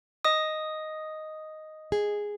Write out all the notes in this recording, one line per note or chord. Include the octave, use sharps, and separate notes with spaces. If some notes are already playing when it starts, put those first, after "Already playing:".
D#5 D#6
G#4